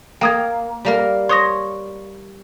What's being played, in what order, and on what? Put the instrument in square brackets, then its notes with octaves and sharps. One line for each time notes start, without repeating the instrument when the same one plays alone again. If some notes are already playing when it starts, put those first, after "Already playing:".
[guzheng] A#3 [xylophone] G5 D#6 G#6
[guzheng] G3 A#3 A#4
[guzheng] C#5 [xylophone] C6 D#6 A#6